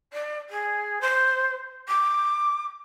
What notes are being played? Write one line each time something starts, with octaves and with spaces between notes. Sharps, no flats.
D5
G#4
C5
D6